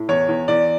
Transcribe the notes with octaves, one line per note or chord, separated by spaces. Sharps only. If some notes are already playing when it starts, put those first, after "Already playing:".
Already playing: A2
E2 C#5
E2
E2 D5